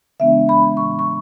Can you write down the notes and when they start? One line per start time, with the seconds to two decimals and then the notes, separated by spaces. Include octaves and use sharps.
0.20 C#3 E3 G#3 B3 D4 E5
0.49 B5
0.77 A2 E3 B3 C#6
0.99 C#6